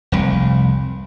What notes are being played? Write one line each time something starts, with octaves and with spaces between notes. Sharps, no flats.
F1 C2